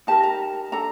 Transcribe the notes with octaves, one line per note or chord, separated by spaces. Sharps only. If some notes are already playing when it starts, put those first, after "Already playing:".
D#4 G4 A#4 A5
A#5
D4 A4 A#5